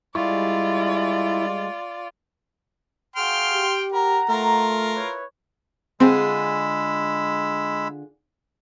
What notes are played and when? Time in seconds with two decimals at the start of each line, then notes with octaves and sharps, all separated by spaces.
0.15 G3 G#3 E4 F4 D5 C#6
3.16 F#4 G#4 F5 G5 C6 F6
3.52 G4
3.93 A#4 F#5 A#5
4.29 A3 F4 A#4
4.94 E4 B4 C#5
6.00 D3 G#3 C4 F4 G#4 B5 E6